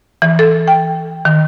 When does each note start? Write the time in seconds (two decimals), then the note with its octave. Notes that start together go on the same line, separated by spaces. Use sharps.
0.22 E3
0.39 A4
0.68 G5
1.25 D#3